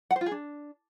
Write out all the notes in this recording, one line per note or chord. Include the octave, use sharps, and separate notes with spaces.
F#5
C5
F4
G#4
D4